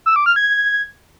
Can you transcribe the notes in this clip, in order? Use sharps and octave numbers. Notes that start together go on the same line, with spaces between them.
E6
D6
F6
G#6